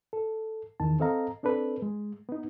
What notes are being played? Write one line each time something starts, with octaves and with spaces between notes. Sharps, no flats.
A4
E2 D#3 A5
C4 A4 D#5 F5 A#5
C4 D4 A4 B4
G#3
B3 D#4